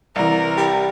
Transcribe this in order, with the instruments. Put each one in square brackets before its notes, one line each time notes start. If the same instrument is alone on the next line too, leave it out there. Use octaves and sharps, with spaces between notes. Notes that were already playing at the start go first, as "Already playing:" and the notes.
[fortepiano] C2 [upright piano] E3 D5 [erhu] A#4
[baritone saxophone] G3